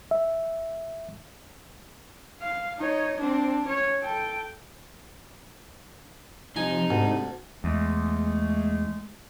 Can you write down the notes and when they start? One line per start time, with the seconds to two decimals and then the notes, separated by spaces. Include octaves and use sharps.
0.11 E5
2.42 F5
2.78 D#4 C#5
3.20 C4 D4
3.65 C#4 C#5
4.02 A4 G5
6.56 C3 F3 D#4 G#5
6.91 D2 G#2
7.64 E2 G#3 A3